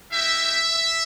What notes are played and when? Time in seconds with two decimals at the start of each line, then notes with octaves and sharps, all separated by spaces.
0.12 A#3 D#4 G4 E5